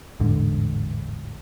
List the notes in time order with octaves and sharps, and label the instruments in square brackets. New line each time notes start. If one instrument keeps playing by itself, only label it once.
[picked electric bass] A1 E2 G#2 D3